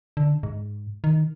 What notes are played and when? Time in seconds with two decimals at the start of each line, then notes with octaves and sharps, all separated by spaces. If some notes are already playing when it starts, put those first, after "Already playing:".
0.17 D3
0.43 G#2
1.04 D#3